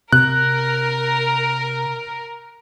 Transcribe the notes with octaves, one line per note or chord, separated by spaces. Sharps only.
C3 A#4 F#6